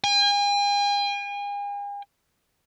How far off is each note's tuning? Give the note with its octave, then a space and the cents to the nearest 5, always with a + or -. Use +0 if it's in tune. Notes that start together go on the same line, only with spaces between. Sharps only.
G#5 -40